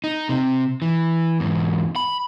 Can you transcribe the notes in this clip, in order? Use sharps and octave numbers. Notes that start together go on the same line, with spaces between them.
D#4
C3
E3
E2 G#2
B5